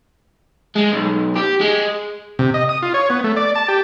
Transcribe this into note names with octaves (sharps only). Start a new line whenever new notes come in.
G#3
B1
G4
G#3
C3
D#5
D#6
F4
C#5
B3
A3
D5
A5
G4